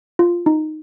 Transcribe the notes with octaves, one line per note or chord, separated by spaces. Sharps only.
F4
D#4